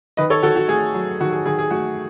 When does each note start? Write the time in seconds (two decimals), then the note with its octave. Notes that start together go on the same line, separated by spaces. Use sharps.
0.17 D#3 B4 D#5
0.30 A4 C#5
0.43 D#3 F#4 A4
0.56 F#4
0.68 A3 G#4
0.94 F#3
1.21 D#3 F#4
1.32 G#4
1.46 D#3 G#4
1.59 G#4
1.70 A3 F#4